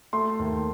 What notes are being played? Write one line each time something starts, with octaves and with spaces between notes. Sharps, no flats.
A3 C6
D#2